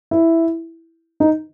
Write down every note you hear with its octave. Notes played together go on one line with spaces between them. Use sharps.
E4
D#4